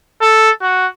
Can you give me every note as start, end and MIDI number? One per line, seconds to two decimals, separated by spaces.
0.21 0.50 69
0.62 0.87 66